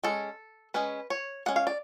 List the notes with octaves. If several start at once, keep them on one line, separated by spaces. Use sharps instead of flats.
G#3 C#4 A4
G#3 C#4 B4
C#5
G#3 C#4 F#5
F5
D5